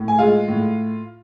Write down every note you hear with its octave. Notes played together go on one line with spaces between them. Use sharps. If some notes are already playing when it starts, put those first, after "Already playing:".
Already playing: A2
G#5
G#3 F4 F5
A2